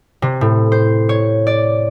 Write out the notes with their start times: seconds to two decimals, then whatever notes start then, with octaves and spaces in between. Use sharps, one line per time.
0.22 C3
0.41 A2
0.72 C5
1.09 C#5
1.47 D5